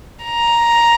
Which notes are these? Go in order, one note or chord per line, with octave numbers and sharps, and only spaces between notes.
A#5